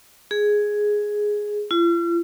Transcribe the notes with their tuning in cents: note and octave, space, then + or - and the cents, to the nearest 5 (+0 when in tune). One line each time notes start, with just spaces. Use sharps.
G#4 +5
F4 -45